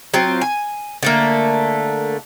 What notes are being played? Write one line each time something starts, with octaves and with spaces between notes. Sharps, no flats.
F#3 C4 F4
G#5
D3 A3 A#3